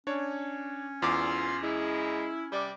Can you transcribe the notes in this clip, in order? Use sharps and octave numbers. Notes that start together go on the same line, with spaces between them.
C#4 D4 C#5
E2 G#2 D3 E4 F4 D6
G#3 E4
C3 G3 D5